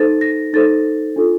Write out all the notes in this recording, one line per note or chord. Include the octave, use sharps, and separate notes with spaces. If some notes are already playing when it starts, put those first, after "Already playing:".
Already playing: D#4 A4 C5 A6
A#6
D#4 A4 C5 A6
D4 F4 A4